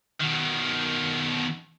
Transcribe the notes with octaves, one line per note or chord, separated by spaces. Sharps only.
B2 D#3